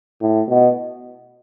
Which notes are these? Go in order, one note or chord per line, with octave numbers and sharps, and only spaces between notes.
A2
B2